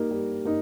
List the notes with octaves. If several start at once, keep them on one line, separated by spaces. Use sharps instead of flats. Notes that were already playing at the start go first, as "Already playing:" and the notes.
Already playing: G3 A#3 D#4 A#4
G3
A#3 D#4